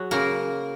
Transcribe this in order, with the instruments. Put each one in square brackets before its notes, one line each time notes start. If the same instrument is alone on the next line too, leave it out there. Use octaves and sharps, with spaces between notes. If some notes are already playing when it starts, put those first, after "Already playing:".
Already playing: [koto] F#3 G#4
C#3 A#3 A#4